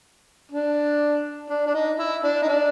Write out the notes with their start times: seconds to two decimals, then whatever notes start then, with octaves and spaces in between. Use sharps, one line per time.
0.51 D4
1.50 D4
1.67 D4
1.74 D#4
1.99 E4
2.24 D4
2.43 D#4
2.48 D4